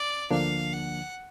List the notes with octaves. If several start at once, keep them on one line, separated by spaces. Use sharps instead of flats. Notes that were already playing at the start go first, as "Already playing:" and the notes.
Already playing: D5
D2 D3 F3 A#3 D4 F5
F#5